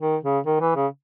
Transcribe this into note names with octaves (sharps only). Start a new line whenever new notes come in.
D#3
C#3
D#3
E3
C#3